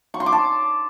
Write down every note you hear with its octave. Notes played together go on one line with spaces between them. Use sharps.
C#6
C6
D6
A5